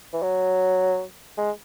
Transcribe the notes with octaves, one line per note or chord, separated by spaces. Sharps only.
E3
F#3
G#3